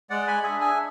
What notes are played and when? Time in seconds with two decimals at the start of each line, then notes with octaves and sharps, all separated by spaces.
0.10 G#3 D5 F#5
0.27 G#5 B5
0.43 D4 G#4 E5 G#5
0.61 E5 G#5